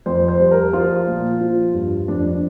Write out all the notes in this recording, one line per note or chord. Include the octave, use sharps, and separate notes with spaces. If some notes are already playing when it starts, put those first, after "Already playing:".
F2 C5
C5
G3
A#4
F3 F4
A#2
F3
G2
F2 D4
D4